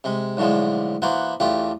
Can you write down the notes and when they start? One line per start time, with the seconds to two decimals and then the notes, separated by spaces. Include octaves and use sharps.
0.04 C3 G#3
0.37 B1 A2 D3 F3 G#3
1.02 E3 A#3 B3 F#4 C5
1.40 A1 E2 A3 F4 G4